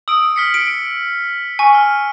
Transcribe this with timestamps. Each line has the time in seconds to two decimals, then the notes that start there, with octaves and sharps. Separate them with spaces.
0.08 D#6 E6 D7
0.36 F6 B6 C#7
0.54 D7
1.59 G#5 C#6
1.75 F6